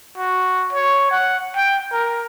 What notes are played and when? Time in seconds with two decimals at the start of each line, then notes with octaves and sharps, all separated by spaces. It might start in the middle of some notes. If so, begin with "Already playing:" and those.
0.18 F#4
0.73 C#5
1.11 F#5
1.56 G5
1.93 A#4